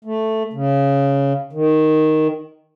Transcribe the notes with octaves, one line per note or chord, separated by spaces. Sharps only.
A3
C#3
D#3